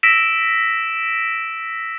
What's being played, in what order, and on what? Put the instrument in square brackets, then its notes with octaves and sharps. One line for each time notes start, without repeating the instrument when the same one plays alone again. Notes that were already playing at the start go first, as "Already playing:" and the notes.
[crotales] E6 A#6 B6 D7 E7